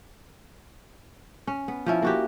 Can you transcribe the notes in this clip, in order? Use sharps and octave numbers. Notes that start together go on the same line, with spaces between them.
C#4
B3
F3 C#4 E4
A#3 F#4 G4